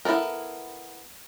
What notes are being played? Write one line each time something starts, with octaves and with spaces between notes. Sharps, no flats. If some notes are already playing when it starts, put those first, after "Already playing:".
B3 E4 F#4 A4 A#4